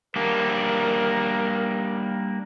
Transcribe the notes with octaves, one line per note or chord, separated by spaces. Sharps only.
G3 A#3 D4 A#4